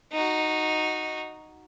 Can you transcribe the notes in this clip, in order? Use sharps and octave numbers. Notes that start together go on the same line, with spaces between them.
D#4 F#4